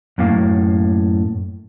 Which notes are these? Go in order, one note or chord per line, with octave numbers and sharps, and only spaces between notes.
F#2 A2 A#3 F5